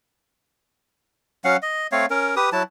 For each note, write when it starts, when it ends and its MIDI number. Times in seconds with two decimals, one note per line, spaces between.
1.44 1.57 54
1.44 1.57 61
1.44 1.57 77
1.44 1.57 78
1.62 1.87 75
1.92 2.06 57
1.92 2.06 60
1.92 2.06 73
1.92 2.06 77
2.10 2.35 61
2.10 2.35 70
2.36 2.50 67
2.36 2.50 71
2.36 2.50 87
2.52 2.63 54
2.52 2.63 64
2.52 2.63 81